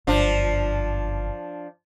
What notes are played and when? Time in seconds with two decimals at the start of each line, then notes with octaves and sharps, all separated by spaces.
0.07 G1 F#2 F3 D4